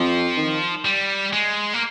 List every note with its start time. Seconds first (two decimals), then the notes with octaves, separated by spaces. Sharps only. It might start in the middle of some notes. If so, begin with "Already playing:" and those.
Already playing: F2 F3
0.37 D#3
0.85 G3
1.33 G#3
1.73 A#3